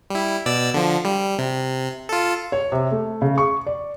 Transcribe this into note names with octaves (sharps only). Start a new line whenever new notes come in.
G3 E4
B2 D5 E6
D3 F3
G3
C3
F4 A4
C#5
C3
A3
C#3
C#6
D5